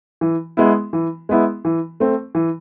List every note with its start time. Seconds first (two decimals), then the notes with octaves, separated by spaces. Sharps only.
0.21 E3
0.57 G#3 B3 E4
0.93 E3
1.29 G#3 B3 E4
1.65 E3
2.00 A3 C4
2.35 E3